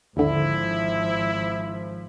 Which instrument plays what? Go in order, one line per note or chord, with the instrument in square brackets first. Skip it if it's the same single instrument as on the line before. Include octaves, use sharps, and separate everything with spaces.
[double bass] G#1 F3 [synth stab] D#2 D3 [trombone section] E4